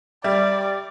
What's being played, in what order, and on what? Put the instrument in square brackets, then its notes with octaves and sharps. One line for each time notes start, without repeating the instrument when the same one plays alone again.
[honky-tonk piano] G3 [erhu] D5 [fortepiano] E5